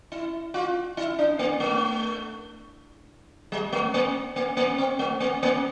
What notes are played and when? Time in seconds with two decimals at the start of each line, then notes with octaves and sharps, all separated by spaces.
0.12 E4
0.54 F4
0.97 E4
1.19 D4
1.39 A#3
1.60 A3
3.52 G3
3.73 A3
3.94 A#3
4.36 A#3
4.57 A#3
4.78 C4
4.99 A3
5.20 A#3
5.43 A#3